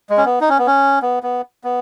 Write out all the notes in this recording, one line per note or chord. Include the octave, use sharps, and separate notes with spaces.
G#3
C#4
B3
D#4
C#4
B3
C#4
B3
B3
B3